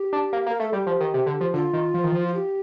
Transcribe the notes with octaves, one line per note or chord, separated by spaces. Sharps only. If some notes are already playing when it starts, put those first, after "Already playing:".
Already playing: G4
D4
A#3
A#3
A#4
A3 A4
G3 G4
F3
D#3
C3
D3
F3
D3 F4
D#3
F3
D#3
F3
F4
G4